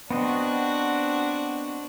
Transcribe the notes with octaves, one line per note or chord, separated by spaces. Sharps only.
B3 C4 D4 F#4 D#5